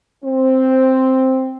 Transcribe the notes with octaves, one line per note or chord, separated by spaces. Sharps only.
C4